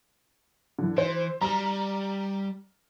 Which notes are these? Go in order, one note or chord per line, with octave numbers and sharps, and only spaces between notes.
D3 E3
E3 C5
G3 A#5 F6